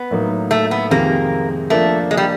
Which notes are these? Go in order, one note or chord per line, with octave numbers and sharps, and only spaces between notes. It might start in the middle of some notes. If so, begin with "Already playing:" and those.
Already playing: B3
A2 F#3 A#3 D#4
A3
B3
F2 C3 D#3 G#3 A#3
F3 A3 A#3 D4
G#3
G3